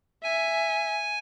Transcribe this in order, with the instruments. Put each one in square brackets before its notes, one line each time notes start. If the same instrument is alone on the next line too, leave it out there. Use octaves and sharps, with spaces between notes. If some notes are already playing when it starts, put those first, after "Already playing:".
[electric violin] E5 [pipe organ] G#5